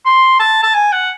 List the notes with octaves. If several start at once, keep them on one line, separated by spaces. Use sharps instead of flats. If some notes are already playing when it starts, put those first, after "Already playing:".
C6
A5
A5
G#5
F#5